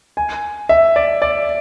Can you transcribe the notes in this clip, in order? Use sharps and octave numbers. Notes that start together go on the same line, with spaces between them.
G#5
E5
D5
D5